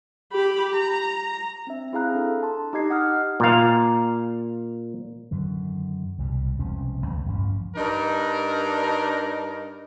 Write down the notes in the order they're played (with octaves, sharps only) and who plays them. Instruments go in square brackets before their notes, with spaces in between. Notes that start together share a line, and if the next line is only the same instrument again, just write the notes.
[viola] G4 B5
A#5
[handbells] C4 D4 E5
C4 E4 G#4 F5 A#5 F#6
D4 A4
A5 C6
D#4 G4 D#5 G#6 C7
F#5 D#6 F6
[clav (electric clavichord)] A#2 F5
[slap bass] F#2 D3 D#3
C2 B2 F#3 G3
E1 C2 F3 C#4
C#2 C#3
A1 G2 F3 C#4
[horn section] G2 D4 D#4 A#4